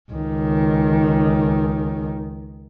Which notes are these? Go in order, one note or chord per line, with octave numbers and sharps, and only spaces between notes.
C#2 D#3